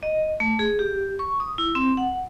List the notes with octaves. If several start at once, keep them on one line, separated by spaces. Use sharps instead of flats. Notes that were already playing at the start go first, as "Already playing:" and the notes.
D#5
A3
G#4
G4
C#6
D#6
E4
C4
F#5